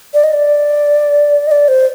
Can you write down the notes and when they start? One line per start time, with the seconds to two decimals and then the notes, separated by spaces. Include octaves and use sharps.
0.14 D5
0.24 D#5
0.33 D5
1.47 D#5
1.51 D5
1.68 C5